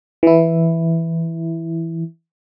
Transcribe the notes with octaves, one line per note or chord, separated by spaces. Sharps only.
E3 E4